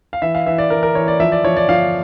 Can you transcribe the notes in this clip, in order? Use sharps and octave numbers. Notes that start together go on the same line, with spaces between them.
F5
E3 E5
F5
E3 E5
D5
E3 A#4
A#4
E3 C#5
D5
F3 E5
D5
F3 C#5
D5
F3 F5